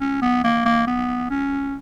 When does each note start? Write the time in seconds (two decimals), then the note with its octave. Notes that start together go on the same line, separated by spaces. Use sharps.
0.01 C#4
0.22 B3
0.44 A#3
0.65 A#3
0.87 B3
1.30 C#4